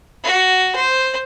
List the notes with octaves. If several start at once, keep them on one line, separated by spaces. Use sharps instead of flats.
F#4
C5